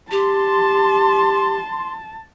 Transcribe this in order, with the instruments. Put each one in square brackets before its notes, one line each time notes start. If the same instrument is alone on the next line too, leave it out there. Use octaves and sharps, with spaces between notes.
[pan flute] G4 [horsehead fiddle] A5 [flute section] C6